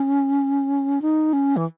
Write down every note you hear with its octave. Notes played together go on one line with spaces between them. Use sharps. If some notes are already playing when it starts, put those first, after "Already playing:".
Already playing: C#4
D#4
C#4
E3